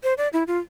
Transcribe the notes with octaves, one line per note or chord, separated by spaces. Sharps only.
C5
D5
E4
F4